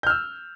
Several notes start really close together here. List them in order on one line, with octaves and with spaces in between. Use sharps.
G6 F6 E6